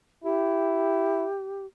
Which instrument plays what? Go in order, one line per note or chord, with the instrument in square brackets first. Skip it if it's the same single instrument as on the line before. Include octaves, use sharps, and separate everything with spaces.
[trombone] E4 [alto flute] G4